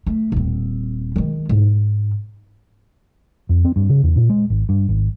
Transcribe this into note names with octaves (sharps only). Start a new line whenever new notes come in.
A3
D#1 C4
D#3 G#3
G#2
F2
C4
G2
C#3
E2
A#2
G#3
G#1
G2
G#1